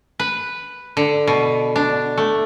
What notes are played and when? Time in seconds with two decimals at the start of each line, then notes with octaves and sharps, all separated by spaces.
0.20 B4
0.97 D3
1.27 B2
1.76 D4
2.18 A3